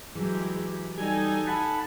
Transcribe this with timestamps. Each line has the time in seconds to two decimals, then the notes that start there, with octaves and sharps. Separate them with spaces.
0.15 E3 F#3 G#3 E4 G4
0.97 G3 D#4 A4 G#5
1.47 F#5 A5 B5